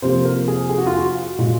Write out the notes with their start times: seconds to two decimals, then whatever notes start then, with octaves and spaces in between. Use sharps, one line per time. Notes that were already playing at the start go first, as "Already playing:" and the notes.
0.02 C3 F3 A#3 C5
0.25 A#4
0.48 G#4
0.69 G#4
0.78 F#4
0.87 F4
0.95 F#4
1.38 A#2 G#3